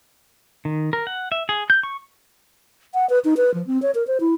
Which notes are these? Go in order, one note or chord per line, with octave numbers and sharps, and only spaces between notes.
D#3
A#4
F#5
E5
G#4
G6
C#6
F#5
B4
D#4
B4
F3
C4
C#5
A#4
C5
E4